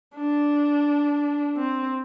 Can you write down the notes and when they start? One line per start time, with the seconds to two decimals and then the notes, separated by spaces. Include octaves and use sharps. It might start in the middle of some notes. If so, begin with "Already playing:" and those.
0.16 D4
1.56 C4